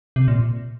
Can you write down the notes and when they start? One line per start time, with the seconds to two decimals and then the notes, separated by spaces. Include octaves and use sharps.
0.16 C3
0.28 A#2